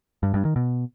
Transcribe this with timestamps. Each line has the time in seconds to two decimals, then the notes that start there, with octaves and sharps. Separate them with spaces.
0.23 G2
0.34 G2
0.45 D#3
0.56 B2